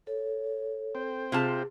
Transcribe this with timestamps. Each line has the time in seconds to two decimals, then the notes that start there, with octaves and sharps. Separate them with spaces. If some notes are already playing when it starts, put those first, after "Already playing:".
0.07 A4 C#5
0.95 C4 C5 G5
1.32 C3 F4 G#4 A5